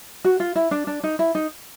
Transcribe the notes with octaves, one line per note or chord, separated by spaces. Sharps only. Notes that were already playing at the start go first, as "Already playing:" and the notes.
F#4
F4
E4
D4
D4
D#4
E4
D#4